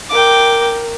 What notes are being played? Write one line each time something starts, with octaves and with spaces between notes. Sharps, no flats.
A#4 G5 D6